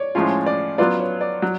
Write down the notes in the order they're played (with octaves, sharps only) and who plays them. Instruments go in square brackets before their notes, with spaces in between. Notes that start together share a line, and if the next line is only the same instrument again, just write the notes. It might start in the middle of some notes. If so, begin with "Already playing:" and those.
Already playing: [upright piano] C#5 D5
[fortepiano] A2 F3 G#3 C#4 F4
[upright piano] D5
[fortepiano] F#3 B3 F4 [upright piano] D5
[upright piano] C#5
D5
[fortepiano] F#3